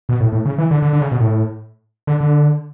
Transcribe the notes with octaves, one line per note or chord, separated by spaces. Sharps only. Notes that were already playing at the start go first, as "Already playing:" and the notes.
B2
A2
A2
C#3
E3
D3
D3
D3
C#3
B2
A2
D3
D3